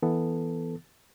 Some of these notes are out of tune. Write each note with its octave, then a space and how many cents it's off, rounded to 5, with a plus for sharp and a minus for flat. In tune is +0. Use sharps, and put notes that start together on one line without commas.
E3 +0 B3 +0 A4 +0